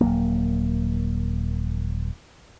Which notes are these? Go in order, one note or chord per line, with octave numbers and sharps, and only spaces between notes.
D#1 D#2 F#3 A#3